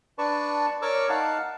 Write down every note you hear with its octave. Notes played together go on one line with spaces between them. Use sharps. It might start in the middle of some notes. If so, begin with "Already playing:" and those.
D4 B4 D5 A5 C#6
A#4 C#5 D5 C#6 D6 E6
D#4 F5 F#5 A5